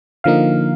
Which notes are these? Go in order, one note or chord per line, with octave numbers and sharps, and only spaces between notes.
D3 F3 A#3 D#4 F5